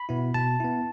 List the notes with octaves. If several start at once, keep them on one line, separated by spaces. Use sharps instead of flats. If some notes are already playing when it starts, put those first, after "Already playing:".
Already playing: B5
B2 B3 E4
B2 A5
B3 E4